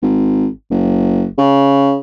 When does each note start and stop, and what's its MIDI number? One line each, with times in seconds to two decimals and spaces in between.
0.02 0.47 32
0.70 1.26 30
1.38 1.97 49